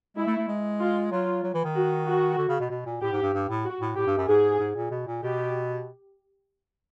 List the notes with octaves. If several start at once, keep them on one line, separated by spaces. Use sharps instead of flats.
G#3 E4
A3
A3
G#3
F4
F#3 F4
F#3
E3
D#3
F#4
F#4
D3
C#3
B2
B2
A#2
A2 G4
G#2
G2
G2
A2
F#4
A2
A2 G4
G2
F#2
G#2 G#4
G#2
A#2
B2
A#2
B2 G4